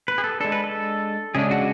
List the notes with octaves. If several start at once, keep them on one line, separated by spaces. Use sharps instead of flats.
B4
G#4
A4
G#3 D4 A4
B4
A4
C#3 G#3 D4 G#4
F#4